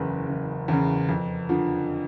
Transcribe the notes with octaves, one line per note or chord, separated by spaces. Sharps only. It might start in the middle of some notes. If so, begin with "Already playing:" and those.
Already playing: F#1 E2 C#3 B4
F#1
E2 C#3
F2
D3 F3